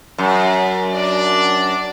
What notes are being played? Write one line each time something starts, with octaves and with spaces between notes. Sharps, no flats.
F#2
D4 D5